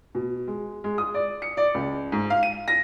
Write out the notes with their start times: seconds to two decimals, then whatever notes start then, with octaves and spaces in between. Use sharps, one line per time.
0.15 B2
0.48 G#3
0.84 G#3
0.98 D#6
1.14 D5
1.42 C#7
1.57 D5
1.74 C#2
2.12 G#2
2.30 F5
2.43 D#7
2.68 A#6